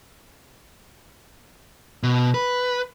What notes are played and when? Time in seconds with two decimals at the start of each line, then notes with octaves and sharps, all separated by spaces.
2.03 B2
2.34 B4